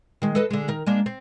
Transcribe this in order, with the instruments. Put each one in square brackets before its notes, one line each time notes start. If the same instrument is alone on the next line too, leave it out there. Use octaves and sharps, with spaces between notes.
[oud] D#3 G#3
A4 B4 D#5
D3 G#3
D#3 A#4
G#3 A#3 D4
C4